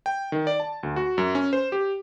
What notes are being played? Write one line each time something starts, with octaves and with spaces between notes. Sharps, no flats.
G5
D#3
D5
A5
D2
F#4
F#2
C#4
C5
G4